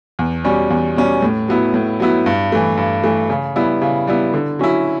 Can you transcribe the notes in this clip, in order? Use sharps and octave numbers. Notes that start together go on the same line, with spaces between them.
E2
B2 G3 C#4
E2
B2 G3 C#4
A2
F#3 B3 E4
A2
F#3 B3 E4
G2
E3 A3
G2
E3 A3
C#3
G3 B3 E4
C#3
G3 B3 E4
D3
F#3 C#4 E4